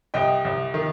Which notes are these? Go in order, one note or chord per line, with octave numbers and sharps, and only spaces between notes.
C2 D#5 G5
C2
D#3